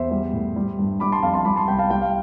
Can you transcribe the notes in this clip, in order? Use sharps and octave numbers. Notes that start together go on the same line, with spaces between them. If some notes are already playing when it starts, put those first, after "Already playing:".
Already playing: E2 C5 E5
G3
A2
G3
G2
G3 B5 D6
A5 C6
F2 F5 A5
A5 C6
G3 B5 D6
A5 C6
C2 G5 B5
F5 A5
G3 G5
F5